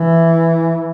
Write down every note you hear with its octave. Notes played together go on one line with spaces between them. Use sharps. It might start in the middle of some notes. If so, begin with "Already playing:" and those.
Already playing: E3